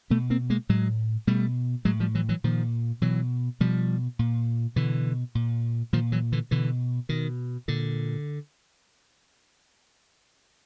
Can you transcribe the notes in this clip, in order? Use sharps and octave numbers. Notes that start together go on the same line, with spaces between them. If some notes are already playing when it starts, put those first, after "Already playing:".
B2 A3 B3
A#3 C4
G#3 A#3
A2 F#3 G#3
B2 G3 A3
A2 F#3 G#3
F3 G3
E3 F#3
E3 F#3
A#2 D#3 F3
B2 E3 F#3
B2 F3 G3
A#2
B2 D3 E3
A#2
A#2 D#3 F3
E3 F#3
D3 E3
B2 D3 E3
B2 D#3
A#2 D3